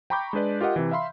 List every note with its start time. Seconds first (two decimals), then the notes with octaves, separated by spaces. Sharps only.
0.10 G5 A#5 B5 C#6 D6 G6
0.33 G#3 D4 B4 D5
0.61 F4 G4 A#4 D#5 F#5
0.76 C3 E3
0.91 E5 F5 B5 C6